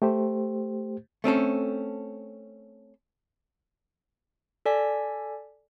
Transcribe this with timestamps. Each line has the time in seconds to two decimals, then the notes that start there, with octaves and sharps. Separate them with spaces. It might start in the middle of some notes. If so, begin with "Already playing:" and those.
0.02 A3 G4 C5
1.24 A3 C4 C#4 A4
4.66 A4 D5 G#5 B6